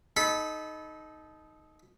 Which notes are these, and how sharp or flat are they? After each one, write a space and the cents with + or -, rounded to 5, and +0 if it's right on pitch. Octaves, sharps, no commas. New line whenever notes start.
D#4 +0 A4 -30 B5 +0